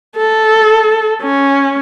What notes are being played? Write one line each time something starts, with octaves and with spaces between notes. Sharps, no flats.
A4
C#4